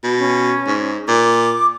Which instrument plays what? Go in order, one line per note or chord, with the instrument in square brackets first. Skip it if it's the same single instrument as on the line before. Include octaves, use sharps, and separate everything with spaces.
[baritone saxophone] B2
[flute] C#4
[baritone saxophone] G#2
[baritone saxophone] A#2 [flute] D6